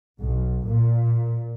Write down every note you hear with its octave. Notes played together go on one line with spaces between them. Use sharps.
B1
A#2